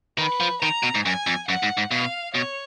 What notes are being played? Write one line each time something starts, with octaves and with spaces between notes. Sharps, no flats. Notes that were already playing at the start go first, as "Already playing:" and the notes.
D#3 B4
F3
D#3 A#5
B2
G#2
F#2 G#5
F2
F#2 F#5
G#2
G#2
B2 F5
B2 C#5